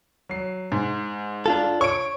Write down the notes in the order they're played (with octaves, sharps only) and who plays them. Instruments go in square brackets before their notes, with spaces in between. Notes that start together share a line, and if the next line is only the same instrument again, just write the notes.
[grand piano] F#3 C7
G#2
[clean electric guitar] D4 F4 A4
[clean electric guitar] C#5 [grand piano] C#6 D7